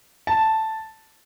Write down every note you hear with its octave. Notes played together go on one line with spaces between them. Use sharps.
A5